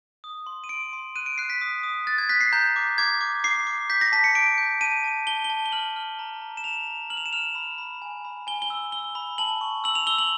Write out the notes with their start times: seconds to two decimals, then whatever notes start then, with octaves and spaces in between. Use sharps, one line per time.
0.24 D#6
0.46 C6
0.64 D#7
0.69 C6 D7
0.93 C6
1.16 F#6 D#7
1.26 D7
1.38 F#6 C7
1.50 B6
1.61 D#6
1.83 D#6
2.07 F#6 A6
2.18 G#6
2.29 F#6 B6
2.41 C7
2.53 A#5 G6
2.76 D6
2.98 D6 G#6
3.21 D6
3.44 D6 C7
3.67 D6
3.90 G6 B6
4.01 A#6
4.12 A5 B6
4.24 C#7
4.35 D6 D7
4.58 G6
4.81 A5 D#7
5.04 A5
5.27 A5 G7
5.44 G7
5.50 A5
5.66 G7
5.72 F6 F#7
5.96 F6
6.19 A#5
6.42 A#5
6.57 E7
6.64 A#5 F7
6.87 A#5
7.10 F6 F#7
7.17 F7
7.25 E7
7.33 F6 F7
7.55 B5
7.78 B5
8.02 G#5
8.25 B5
8.47 G#5 G7
8.62 G7
8.70 E6
8.92 E6 G7
9.15 B5
9.38 A5 F#7
9.61 C#6
9.84 E6 F#7
9.95 F7
10.07 E6 G7
10.18 F#7